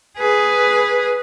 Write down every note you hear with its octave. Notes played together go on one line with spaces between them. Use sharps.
G#4 B4